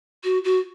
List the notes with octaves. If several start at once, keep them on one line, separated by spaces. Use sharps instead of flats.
F#4
F#4